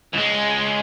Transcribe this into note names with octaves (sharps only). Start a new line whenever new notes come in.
C#2 G#3